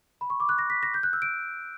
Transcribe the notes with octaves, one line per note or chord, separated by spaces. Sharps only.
B5
C#6
D6
F#6
A#6
B6
A#6
G6
F#6
E6
D7